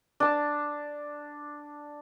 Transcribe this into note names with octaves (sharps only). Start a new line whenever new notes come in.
D4 A5